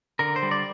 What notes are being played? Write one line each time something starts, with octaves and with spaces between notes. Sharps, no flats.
D3 A#4
C5
G3
D5